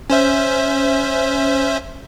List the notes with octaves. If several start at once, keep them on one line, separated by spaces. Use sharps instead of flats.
C#4 C5 E5